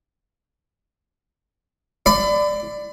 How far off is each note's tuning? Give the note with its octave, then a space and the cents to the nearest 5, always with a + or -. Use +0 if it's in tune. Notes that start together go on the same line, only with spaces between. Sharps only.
D5 +10 B5 +35